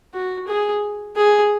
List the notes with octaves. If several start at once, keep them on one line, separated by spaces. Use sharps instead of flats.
F#4
G#4
G#4